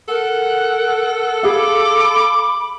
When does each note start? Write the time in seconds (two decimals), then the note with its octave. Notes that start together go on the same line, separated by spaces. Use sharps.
0.08 A4 A#4 F#5
1.43 G#4 F5 B5 D6